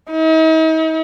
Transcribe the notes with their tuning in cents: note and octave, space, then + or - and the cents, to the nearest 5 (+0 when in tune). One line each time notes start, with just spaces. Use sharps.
D#4 +45